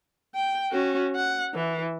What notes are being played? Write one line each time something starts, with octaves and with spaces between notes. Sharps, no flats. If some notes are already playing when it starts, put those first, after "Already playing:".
G5
C#4 F#4
F#5
E3